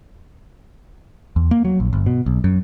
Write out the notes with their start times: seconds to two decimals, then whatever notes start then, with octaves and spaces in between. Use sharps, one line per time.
1.36 E2
1.51 A#3
1.65 F#3
1.80 A#1
1.93 G1
2.06 B2
2.26 B1
2.44 F#2